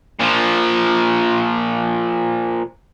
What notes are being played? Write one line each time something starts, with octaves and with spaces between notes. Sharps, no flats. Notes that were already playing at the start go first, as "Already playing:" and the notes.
A#2 F3